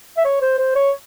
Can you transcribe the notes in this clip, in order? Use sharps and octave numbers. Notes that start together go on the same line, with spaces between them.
E5
C#5
C5
C5
C#5